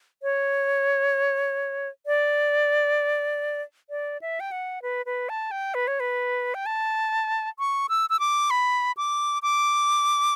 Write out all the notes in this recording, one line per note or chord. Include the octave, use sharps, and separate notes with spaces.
C#5
D5
D5
E5
G5
F#5
B4
B4
A5
G5
B4
C#5
B4
G5
A5
C#6
E6
E6
D6
B5
D6
D6